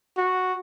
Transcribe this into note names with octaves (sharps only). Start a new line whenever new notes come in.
F#4